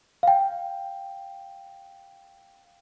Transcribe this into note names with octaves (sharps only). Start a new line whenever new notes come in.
F5 G5